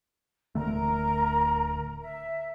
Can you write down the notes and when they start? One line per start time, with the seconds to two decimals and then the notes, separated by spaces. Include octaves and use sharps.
0.55 D1 D3 A3 A#4 A#5
2.02 E5